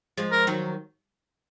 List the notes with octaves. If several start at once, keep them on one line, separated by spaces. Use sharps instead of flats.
F3 G#3
A#4
D#3 F#3